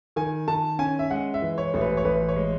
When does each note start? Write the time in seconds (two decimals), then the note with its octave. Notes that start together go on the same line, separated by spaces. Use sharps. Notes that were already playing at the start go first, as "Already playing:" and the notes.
0.16 D#3 G#5
0.48 D#3 A5
0.79 C#4 G#5
0.99 E5
1.11 G#3 F#5
1.34 E5
1.42 E3
1.58 C#5
1.74 A1
1.81 B4
1.97 C#5
2.05 A1 B4
2.29 C#5
2.36 G#3